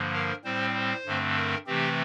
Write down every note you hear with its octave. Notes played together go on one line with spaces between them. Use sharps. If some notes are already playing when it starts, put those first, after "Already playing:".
Already playing: G2 D3 F3 A#3
A#4
A2 G3 C4 C5
C5
G2 D3 A3 C4
A#4
C3 E3 A3 C4 G4